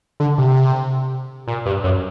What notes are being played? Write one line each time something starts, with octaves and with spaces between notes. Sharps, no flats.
D3
C3
A#2
G2
F#2